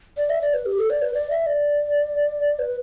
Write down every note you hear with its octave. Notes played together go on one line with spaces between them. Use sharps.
D5
E5
D5
B4
G4
A4
D5
B4
D5
E5
D5
B4